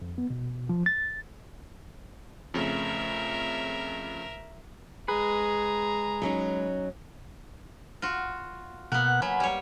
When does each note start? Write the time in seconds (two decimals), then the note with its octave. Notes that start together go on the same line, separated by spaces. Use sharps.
0.02 F2
0.18 B3
0.30 B2
0.69 F3
0.86 A6
2.54 F2 C#3 A3 A#4 E5
5.08 G#3 G#4 B4 A#5
6.22 F#3 C#4 D#4
8.02 F4 F#4
8.92 B2 A#3 B3 F#5 F#6
9.22 F#3 G#5 B5
9.40 G3 C#5